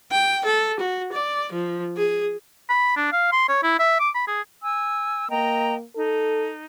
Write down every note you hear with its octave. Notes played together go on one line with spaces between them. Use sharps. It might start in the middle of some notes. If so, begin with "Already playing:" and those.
G5
A4
F#4
D5
F3
G#4
B5
D4
F5
C6
C#5
E4
E5
D6
B5
G#4
G#5 E6
A#3 D#5 G5 A#5
D#4 A4